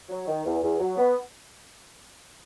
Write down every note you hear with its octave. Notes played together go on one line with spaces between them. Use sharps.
F#3
D#3
E2
E2
F#3
B3